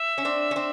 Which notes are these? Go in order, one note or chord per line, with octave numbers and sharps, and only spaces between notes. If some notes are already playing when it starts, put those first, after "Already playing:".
Already playing: E5
C#4
C4 D4
C#4
C4 D4